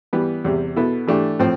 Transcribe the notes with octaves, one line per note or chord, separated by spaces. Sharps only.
E3 G3 B3
E2 C3 G3
B2 B3 E4 A4
E3 A3 D4 G4
A2 F3 C4